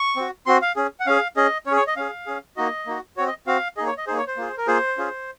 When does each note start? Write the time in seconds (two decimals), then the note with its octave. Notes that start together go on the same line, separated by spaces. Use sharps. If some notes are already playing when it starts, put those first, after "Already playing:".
Already playing: C#6
0.16 C4 F#4
0.46 C4 F#4 C6
0.62 F5
0.76 C#4 G#4
1.00 F#5
1.06 C#4 G#4 F5
1.37 C#4 G#4 D#5
1.66 C#4 G#4 C#5
1.76 C#5
1.87 D#5
1.96 C#4 G#4 F5
2.26 C#4 G#4
2.57 A#3 D#4 F#4 D#5
2.87 A#3 D#4 F#4
3.17 C4 F#4 C#5
3.27 D#5
3.47 C4 F#4 F5
3.77 A#3 D#4 G#4 D#5
3.87 C#5
3.98 D#5
4.07 A#3 D#4 G#4 C5
4.17 C#5
4.27 C5
4.37 A#3 F4 G#4
4.57 A#4
4.67 A#3 F4 G#4 C5
4.98 C#4 F4 G#4